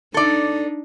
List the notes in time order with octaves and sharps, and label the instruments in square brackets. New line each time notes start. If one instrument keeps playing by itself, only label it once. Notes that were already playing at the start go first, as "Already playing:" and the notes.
[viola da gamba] D4 D#4 [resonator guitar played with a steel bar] A4 D5